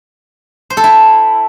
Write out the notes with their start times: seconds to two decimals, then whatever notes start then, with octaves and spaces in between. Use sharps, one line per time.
0.70 C5
0.77 A4
0.84 E4